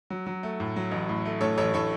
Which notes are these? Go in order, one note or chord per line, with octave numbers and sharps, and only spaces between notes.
F#3
F#3
A3
A2
F#3
A1
A2
A3
A2 A4 C#5
A1 A4 C#5
A2 A4 C#5